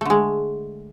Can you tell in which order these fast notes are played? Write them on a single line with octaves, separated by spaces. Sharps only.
A3 D3 G#3